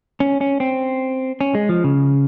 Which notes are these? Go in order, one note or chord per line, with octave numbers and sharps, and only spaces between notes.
C#4
C#4
C4
C#4
G#3
F3
C#3